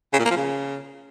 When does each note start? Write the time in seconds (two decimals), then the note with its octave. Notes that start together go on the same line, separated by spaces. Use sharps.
0.13 C#3
0.19 A#2
0.25 A#3
0.31 F3
0.37 C#3